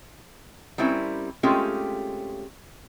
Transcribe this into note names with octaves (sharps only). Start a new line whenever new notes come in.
G3 C4 C#4 E4 A#4
G#3 A3 C4 C#4 F4 G4